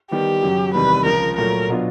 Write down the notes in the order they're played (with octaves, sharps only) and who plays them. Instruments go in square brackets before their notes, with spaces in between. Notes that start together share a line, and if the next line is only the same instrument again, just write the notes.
[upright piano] D#3 G3 B3 [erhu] G4
[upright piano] F#2 C#3 F#3
[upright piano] E2 C3 D#3 G3 [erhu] B4
[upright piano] C#2 C#3 F3 [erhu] A#4
[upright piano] A#2 F#3 A3 [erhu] A#4
[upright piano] B2 F#3 B3 D4 F4